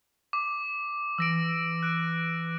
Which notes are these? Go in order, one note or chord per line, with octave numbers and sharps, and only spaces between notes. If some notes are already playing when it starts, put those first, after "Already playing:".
D6
E3 E6 A#6 D7
F#6 D7